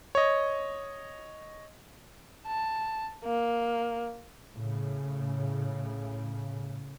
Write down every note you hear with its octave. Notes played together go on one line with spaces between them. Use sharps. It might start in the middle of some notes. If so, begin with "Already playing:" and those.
C#5 D#5
A5
A#3
A2 C#3